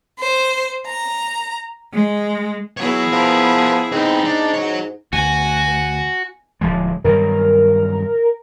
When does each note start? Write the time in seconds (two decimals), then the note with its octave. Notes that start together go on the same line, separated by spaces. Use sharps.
0.19 C5
0.86 A#5
1.94 G#3
2.77 F#3 B3 E4 G#4 C#5
3.12 F3 A#4 B4
3.92 G#2 C4 D#4 B4
4.25 D4
4.54 F#4 C#5
5.13 D2 F#4 G#5
6.61 D1 F3 G#3
7.04 G2 D#3 F#3 A#4